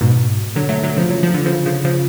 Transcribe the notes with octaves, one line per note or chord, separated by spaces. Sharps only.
G#2 B2
D3 F#3
F#3 A3
D3 F#3
C#3 F3
F#3
F3
D3
C#3 F3
C#3 F3
C#3 F3